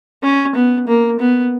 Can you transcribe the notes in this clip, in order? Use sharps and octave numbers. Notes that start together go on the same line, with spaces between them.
C#4
B3
A#3
B3